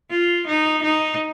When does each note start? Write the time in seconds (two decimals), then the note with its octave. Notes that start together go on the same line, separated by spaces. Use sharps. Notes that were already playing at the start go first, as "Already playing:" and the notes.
0.11 F4
0.47 D#4
0.83 D#4